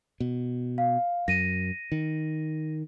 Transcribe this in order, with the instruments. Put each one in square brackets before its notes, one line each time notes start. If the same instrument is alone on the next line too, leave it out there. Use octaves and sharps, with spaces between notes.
[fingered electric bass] B2
[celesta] F5
[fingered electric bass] F#2 [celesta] A#6 D#7
[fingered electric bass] D#3